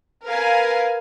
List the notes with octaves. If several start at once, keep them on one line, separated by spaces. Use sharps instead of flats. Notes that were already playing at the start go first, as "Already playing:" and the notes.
A#4 B4 F5 G#5